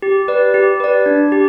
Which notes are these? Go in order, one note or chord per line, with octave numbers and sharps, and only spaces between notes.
G4
B4 D5
G4
B4 D5
D4
G4